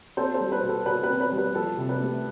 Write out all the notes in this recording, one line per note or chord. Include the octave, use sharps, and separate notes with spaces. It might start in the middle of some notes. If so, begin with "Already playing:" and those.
C4 A4 C5
A4 C5
G3
B4
B2
A4
B2 B4
B4
C4
B4
G3
B4
F3 A4
C3
B4
A3